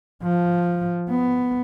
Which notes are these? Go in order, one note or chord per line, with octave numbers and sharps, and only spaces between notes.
F3
B3